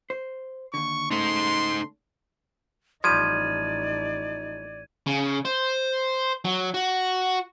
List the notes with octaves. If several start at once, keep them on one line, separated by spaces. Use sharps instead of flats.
C5
D#2 D3 C#6
C#3 A3 D#4 C5 C6
A1 F3 G3 D#4 D5 G#6 D#7
C#3
C5
F#3
F#4